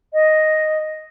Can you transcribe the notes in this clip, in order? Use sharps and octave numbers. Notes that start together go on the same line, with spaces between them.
D#5